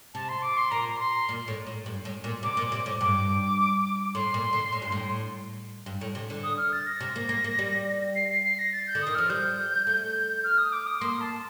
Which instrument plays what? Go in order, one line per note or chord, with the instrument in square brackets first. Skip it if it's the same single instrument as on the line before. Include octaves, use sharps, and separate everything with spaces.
[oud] C3 [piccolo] A5
[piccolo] C6
D6
C6
[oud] A#2 [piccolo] A#5
[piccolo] C6
[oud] A#2
A2
A2
G2
A2
A#2
[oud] C3 [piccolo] D6
[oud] A#2
C3
A2
[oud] G2 [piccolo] D6
[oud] A2 [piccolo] C6
[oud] A#2
D3
A2
G2
A2
G2
A2
C3
D3
[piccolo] D#6
F6
A6
A#6
[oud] C3
A#3
A#3
A#3
G3
[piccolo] C7
C7
C7
A#6
A6
G6
[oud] D3
[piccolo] D#6
[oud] D#3
[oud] F3 [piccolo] F6
[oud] G3 [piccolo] G6
[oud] A3
[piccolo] F6
D#6
D6
D#6
[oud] A#3 [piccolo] C6
[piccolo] A5